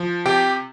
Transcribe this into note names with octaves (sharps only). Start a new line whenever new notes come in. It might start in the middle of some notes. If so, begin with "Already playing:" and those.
Already playing: F3
C3 G4 G5